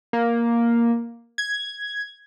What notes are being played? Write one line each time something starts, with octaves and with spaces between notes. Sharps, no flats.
A#3
G#6